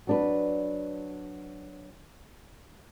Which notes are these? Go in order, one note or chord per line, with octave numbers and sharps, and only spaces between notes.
F#3 D4 B4